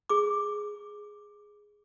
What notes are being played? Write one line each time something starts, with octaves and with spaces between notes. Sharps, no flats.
G#4 D6